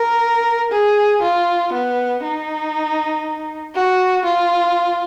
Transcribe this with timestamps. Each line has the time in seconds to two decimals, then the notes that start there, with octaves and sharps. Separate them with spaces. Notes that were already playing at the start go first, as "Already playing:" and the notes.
Already playing: A#4
0.72 G#4
1.22 F4
1.73 B3
2.23 D#4
3.75 F#4
4.25 F4